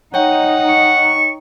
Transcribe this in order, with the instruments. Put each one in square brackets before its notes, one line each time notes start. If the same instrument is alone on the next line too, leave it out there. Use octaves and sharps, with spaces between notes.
[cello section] D#4 [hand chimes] C#5 G5 [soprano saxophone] F#5
[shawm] C#6